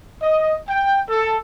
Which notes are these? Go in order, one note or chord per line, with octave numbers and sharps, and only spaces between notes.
D#5
G5
A4